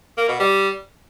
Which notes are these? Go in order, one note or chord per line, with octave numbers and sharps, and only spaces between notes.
A#3
B2
G3